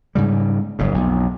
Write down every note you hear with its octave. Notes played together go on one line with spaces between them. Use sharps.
G#2 C#3 G3
F#1 F2 G#2
B1 F2